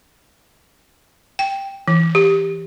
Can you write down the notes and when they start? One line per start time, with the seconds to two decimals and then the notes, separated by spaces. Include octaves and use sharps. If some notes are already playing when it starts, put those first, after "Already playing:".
1.39 G5
1.88 E3
2.15 G4